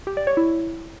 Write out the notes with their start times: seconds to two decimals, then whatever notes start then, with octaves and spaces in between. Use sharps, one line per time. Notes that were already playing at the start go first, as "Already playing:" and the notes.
0.07 G4
0.17 D5
0.27 C#5
0.37 E4